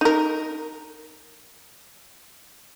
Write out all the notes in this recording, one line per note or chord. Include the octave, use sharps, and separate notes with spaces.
D#4 A#4